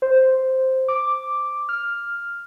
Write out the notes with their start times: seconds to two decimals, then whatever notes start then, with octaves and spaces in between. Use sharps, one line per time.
0.02 C5
0.88 D6
1.69 F6